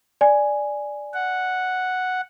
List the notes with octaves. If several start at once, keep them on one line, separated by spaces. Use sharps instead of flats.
D5 G#5
F#5